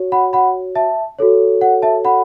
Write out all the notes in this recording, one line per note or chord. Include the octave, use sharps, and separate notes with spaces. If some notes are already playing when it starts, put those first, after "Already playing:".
Already playing: F#4 C#5
F#5 B5
F#5 B5
E5 A5
F#4 A4 C#5
F#5
E5 A5
F#5 B5